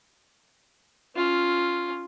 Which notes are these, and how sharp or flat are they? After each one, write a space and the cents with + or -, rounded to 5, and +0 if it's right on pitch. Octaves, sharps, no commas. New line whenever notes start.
C#4 +5 F4 +0